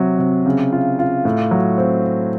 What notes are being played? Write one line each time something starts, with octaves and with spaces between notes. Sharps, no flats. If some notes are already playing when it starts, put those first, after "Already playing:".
Already playing: C3 F#3
C3
C#3
F4
F4
A2
F#3
C4